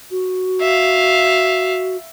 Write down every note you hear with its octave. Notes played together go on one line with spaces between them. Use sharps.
F#4
E5 F5